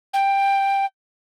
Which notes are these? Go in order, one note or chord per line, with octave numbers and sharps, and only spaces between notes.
G5